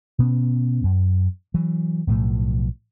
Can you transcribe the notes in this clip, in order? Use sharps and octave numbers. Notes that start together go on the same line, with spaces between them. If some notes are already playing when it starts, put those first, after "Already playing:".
B2 B3 C#4
F#2
E3 F#3
B1 A2 F3 A3